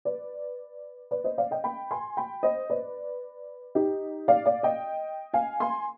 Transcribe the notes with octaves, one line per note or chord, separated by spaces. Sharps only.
B4 D5
B4 D5
C5 D#5
D5 F5
D#5 G5
G5 B5
G#5 C6
G5 B5
C5 D#5
B4 D5
D#4 G4
D5 F5
D5 F5
D#5 G5
F5 G#5
G#5 C6